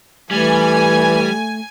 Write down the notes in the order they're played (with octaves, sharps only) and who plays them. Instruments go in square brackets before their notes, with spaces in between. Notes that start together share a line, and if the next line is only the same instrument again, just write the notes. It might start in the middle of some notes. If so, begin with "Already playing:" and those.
[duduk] E3 [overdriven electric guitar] G3 [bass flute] A3 [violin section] G#5